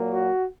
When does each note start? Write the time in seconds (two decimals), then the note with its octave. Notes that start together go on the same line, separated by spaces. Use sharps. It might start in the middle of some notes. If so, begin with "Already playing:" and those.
Already playing: A#2 F#3 A#3
0.12 F#4